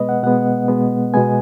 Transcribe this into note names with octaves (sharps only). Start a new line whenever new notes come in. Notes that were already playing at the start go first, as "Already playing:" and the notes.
Already playing: B2 G#3 B3 B4 D#5
F#5
B2 G#3 B3 F#5
B2 G#3 B3
B2 G#3 B3 G#5